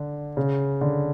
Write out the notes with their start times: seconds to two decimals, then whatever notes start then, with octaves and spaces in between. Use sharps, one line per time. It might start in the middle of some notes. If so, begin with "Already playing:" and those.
Already playing: D3
0.37 C#3
0.81 D3